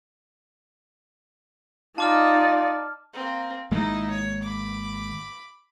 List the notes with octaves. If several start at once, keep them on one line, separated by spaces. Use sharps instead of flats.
D#4 F4 D5 A5 D6 F6
A#3 C4
G#1 G#3 A#3 D#4 E4
C#5
B5 D6